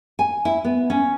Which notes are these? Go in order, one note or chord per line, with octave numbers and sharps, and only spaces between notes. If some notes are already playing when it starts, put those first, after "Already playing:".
G#5
E4
B3
C#4